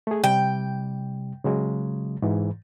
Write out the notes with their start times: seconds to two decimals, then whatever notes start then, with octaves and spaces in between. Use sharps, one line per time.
0.07 A3 G#4
0.24 C3 G3 G5
1.44 C#3 F#3 G#3
2.22 G#2 E3